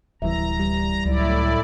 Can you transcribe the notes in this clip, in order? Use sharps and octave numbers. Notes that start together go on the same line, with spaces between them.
D1 E3 G3 E5 A#5
G3
C#2 A2 F#3 E4 D5